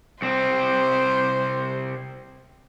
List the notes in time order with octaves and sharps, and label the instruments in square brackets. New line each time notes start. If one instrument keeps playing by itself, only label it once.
[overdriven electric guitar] C2 C4 [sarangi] C5